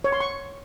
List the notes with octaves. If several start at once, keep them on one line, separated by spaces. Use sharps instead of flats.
C#5
C6
C#6